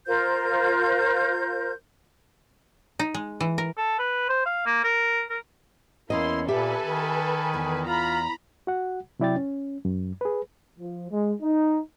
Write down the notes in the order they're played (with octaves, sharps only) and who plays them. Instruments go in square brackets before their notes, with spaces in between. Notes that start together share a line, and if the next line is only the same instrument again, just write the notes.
[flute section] F4 A#4 C5 G6
[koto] D#4
G#3
E3
A#4
[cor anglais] A4
B4
C5
F5
A#3
A#4
A#4
[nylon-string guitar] E2 C#4 D#5 [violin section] A#3 C6 [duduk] E4
[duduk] A#2 [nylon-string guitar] G4 E5 [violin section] A4 B4 G#5
[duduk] D#3
[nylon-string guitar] E2
[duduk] F4 [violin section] A#5 B5
[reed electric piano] F#4 F#5
C3 F#3 E4 D5 G5 A6
C#4
F#2
G#4 B4
[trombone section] F3
G#3
D#4